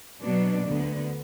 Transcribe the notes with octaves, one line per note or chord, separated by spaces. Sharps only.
B2 F#3 B3 D4
D2 D3 B3